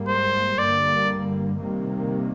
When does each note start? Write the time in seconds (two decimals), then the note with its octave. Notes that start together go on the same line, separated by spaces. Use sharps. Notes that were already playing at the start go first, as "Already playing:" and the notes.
Already playing: G#2 G3 A#3
0.08 C5
0.58 G2 D3 G3 A#3 D5
1.58 C3 D#3 G3 A#3